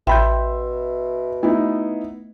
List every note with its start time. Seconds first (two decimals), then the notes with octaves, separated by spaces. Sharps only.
0.07 A1 B2 E5 G5 B5 C6 G6
1.43 A3 B3 D#4 E4